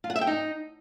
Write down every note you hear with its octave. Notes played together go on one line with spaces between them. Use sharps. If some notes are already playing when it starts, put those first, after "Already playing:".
F4
F#5
E5
G5
D#4